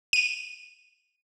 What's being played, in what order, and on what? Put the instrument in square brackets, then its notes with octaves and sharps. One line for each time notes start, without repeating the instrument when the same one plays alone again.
[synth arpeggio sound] D#7